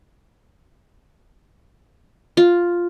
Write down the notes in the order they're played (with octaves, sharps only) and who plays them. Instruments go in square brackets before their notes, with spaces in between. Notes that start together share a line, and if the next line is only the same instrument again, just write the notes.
[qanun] F4